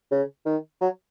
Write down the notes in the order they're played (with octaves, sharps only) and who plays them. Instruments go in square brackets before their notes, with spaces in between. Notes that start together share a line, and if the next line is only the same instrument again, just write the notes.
[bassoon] C#3
D#3
F#3